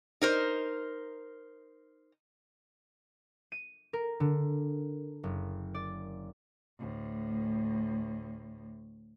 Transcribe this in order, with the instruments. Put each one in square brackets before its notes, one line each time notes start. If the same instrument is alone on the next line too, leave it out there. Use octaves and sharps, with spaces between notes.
[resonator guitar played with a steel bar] D#4 A#4 C5
[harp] D#7
A#4
D3
F#1
D5
[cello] D2 A2